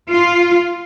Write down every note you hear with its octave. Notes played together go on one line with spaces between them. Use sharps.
F4